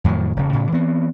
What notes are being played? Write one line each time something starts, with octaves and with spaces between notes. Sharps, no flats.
F2 A2 D#3 F#3
E1 C#3
A2 C#3
E3 B3 C4